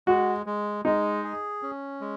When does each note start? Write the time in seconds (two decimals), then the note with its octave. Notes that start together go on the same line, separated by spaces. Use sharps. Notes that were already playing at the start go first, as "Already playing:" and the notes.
0.07 G#3 F#4
0.46 G#3
0.85 G#3 D#4
1.24 G#4
1.62 C#4
2.01 G#3